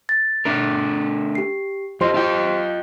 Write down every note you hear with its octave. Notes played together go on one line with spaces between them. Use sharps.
A6
A3 D4 A#4
G4 C7
F2 F4 G4 C5 D#5 C6
F4 D#5 G5